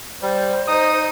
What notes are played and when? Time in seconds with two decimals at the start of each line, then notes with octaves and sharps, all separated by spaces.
0.22 G3 C5
0.68 D#4 D#6